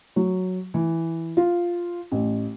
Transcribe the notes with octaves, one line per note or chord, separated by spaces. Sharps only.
F#3
E3
F4
A1